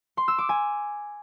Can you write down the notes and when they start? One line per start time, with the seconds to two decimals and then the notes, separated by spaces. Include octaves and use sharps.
0.17 C6
0.28 E6
0.38 D6
0.49 G#5